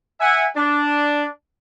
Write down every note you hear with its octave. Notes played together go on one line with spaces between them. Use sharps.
E5 F#5 G#5
D4